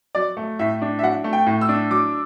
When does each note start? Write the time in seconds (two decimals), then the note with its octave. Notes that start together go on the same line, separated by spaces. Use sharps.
0.15 F#3 D5
0.37 A3
0.59 A2 E5
0.82 D4
0.99 E5
1.02 F#3 F#5
1.24 A3
1.33 G5
1.46 A2
1.61 E6
1.69 D4
1.90 F#3 D6